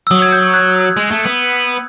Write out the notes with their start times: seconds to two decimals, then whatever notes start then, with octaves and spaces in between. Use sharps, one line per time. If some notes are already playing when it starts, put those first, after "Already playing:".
0.07 E6
0.11 F#3 D#6
0.22 G#6
0.33 G6
0.54 F#6 G#6
0.97 G#3
1.11 A3
1.25 B3